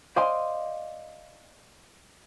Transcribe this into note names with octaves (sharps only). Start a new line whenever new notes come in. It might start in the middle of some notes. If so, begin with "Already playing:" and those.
C5 D5 D#5 F5 G#5 C6